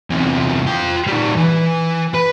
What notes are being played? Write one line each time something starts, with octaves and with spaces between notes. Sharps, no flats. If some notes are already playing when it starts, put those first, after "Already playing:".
E2 C3
F4 G5
G3 D#4
E3
B4 B5